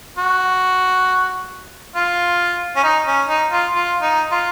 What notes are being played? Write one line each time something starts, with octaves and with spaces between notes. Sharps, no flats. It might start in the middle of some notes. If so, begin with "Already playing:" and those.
F#4
F4
C#4
D#4
C#4
D#4
F4
F4
D#4
F4